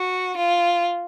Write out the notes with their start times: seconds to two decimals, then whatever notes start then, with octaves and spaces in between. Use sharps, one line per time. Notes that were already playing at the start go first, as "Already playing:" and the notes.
Already playing: F#4
0.37 F4